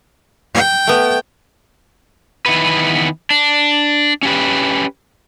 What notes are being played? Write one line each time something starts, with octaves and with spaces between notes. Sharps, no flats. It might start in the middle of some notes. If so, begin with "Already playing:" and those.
G5
A3 B3
D#3 E3 B3 B4
D4
C#4 G4 B4